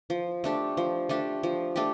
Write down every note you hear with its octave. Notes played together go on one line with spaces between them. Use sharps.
F3
A3 D4 G4
F3
A3 D4 G4
F3
A3 D4 G4